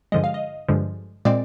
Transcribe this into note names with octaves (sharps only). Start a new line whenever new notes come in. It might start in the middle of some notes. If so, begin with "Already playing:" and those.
G2 D3 F3 G#3 D#5
F5
D#5
G2 D3 F3 G#3
A#2 G#3 C4 D5